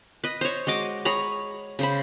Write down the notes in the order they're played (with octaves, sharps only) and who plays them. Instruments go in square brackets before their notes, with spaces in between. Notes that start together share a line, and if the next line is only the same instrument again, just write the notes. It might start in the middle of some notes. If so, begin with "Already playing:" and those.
[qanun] B4 D#5
C5 C#5
G#3 F#4 D#5 D6
G#4 C#5 A#5 B5
C#3 C5 B5